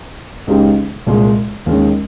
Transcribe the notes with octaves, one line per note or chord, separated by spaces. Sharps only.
C#2 C#3 G#3 D#4 G4
C2 A#2 G#3
D#2 D#3 G#3 C#4